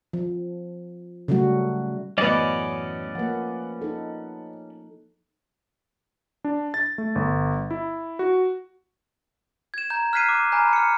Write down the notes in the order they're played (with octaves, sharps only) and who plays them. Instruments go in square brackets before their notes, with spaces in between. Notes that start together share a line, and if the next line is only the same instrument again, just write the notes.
[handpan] F3
C#3 F#3 G3 A3 F#4
[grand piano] F#2 A2 E3 [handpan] A3 [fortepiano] B3 D#5 [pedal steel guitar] C#4 D5
[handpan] F3 A#3 [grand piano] B4 F#5
[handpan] D#4 A4
[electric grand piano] D4
A6
A3
G1
E4
F#4
[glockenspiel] G#6 E7
A#5 G6
F6 F#6 G#6 B6 C7 D#7
D6
G#5 A#5 B5 F6 G6
F6 C#7